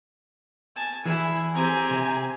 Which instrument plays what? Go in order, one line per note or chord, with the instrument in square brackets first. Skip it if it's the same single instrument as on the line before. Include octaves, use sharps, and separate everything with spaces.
[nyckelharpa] G#5 A5
[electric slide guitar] E3 G#4 [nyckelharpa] E4
[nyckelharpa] C4 G4 [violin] G#5 A#5
[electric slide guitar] C3